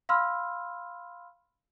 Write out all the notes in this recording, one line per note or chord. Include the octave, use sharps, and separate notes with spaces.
F5 B5 C6 E6 F6